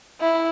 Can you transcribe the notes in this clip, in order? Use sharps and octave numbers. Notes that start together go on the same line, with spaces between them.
E4